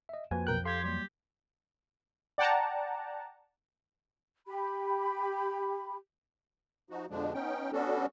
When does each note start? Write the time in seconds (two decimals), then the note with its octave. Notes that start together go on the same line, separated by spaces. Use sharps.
0.09 D#5 E5
0.31 F2 A#3 F#4 B4 G#5
0.47 B1 A#4 G5 F#6
0.65 G4 A4 F5 C6 G#6
0.84 F#3 G3 A#3 G4
2.38 D5 F#5 G5 A5 A#5
4.47 G4 B5
6.90 F3 D#4 F#4
7.10 F2 B2 D3 F3 G#3 D4
7.34 B3 C#4 D#4 G5
7.73 G3 B3 C#4 D4 F#4 A4